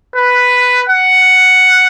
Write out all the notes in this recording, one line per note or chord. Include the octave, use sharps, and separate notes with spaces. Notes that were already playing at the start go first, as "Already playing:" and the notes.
B4
F#5